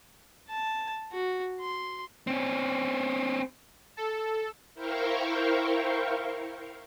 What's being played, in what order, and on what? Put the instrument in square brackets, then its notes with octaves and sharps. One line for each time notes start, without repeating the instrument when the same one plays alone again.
[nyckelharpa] A5
F#4
C6
[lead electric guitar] C4 C#4
[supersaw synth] A4
[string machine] E4 A#4 C5 F5 G5 C#6